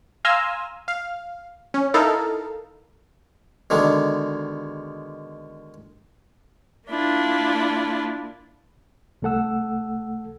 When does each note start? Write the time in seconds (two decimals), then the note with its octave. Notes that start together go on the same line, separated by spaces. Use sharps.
0.25 F5 G#5 A#5 C6 E6
0.88 F5
1.74 C#4
1.94 D#4 E4 A4 A#4 F5
3.70 B2 D3 D#3 G#3
6.88 A#3 D4 E4 F4
9.22 C2 A3 A4 F#5 E6